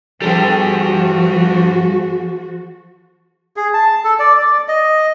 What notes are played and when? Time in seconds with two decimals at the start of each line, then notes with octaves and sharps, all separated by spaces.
0.22 G2 F3 G3 B3 F#4 G#4 A4
3.56 G#4
3.73 A5
4.04 A4
4.19 D5
4.37 D5
4.68 D#5